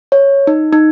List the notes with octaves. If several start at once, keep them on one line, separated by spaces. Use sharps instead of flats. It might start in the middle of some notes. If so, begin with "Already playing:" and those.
C#5
D#4
D#4